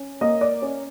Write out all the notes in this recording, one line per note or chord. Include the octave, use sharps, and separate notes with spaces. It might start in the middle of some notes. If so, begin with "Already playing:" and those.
Already playing: C#4
A#3 D#5
D5
C#4